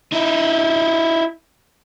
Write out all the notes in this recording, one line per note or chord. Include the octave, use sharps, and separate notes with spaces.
D#4 E4